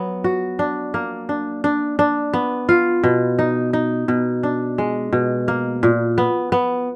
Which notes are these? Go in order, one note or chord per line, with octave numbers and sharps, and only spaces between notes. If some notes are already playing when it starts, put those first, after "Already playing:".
Already playing: F#3 B3
F#4
D4
A#3
D4
D4
D4
B3
F4
B2
D#4
D#4
B2
D4
G#3
B2
A#3
A#2
B3
B3